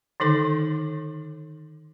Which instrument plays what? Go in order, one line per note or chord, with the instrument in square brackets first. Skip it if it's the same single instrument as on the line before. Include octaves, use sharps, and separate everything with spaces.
[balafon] D3 D#3 D#4 A4 C6